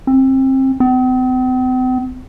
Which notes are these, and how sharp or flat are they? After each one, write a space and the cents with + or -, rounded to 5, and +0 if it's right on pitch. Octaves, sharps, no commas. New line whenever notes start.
C4 +25
C4 -45